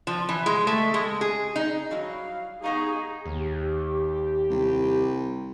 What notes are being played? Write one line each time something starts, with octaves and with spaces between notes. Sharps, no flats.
F3
E3
G#3
A3
G#3
G#4
D#4
F#3 G3 E4 F5
B3 D#4 G#4 D#5 F5 C#6
D#2 G4
C2